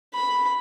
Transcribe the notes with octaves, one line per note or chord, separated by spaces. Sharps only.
B5